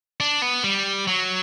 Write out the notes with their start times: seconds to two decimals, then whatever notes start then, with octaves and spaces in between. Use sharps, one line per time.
0.20 D4
0.42 B3
0.64 G3
1.07 F#3